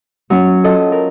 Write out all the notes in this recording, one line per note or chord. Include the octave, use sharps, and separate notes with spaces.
F#3 C#4
F4 A4 D#5
A#4